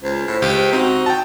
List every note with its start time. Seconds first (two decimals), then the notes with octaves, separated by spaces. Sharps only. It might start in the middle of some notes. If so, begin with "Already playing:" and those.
0.02 C#2 C5
0.28 A2
0.42 C#2 G4
0.73 C4 D#4 F#4
1.06 G5 A5